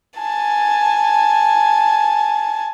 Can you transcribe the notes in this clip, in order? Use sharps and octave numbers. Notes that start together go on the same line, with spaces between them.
G#5 A5